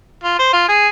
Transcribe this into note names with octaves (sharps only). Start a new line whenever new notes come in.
F4
C5
F4
G#4